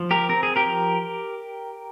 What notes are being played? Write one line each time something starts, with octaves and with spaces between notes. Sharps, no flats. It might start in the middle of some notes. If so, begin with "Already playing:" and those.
Already playing: F3
G4 A#4
C4 A#4
G#4
G4 A#4
F3